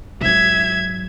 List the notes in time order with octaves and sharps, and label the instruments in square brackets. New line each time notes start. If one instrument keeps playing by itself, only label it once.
[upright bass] G#2 F#3 [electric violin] E5 G#6